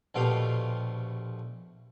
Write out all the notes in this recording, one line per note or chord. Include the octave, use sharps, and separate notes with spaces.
A#1 B2 A3 G4 F5